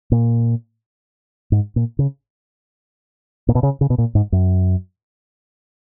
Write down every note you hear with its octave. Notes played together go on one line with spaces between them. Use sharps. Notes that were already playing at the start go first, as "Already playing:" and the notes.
A#2
G#2
A#2
C#3
A#2
B2
C#3
C#3
B2
A#2
G#2
F#2